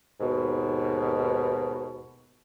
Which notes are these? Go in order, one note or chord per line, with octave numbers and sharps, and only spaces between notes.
D#2 G#2 B2